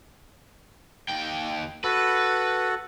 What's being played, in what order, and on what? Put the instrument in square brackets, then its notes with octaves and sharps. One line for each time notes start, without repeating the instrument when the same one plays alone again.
[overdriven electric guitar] D#2 G5
[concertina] F#4 A4 [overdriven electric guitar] B4